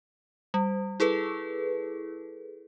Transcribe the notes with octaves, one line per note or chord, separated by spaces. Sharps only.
G3
E4 G#4 A4 B4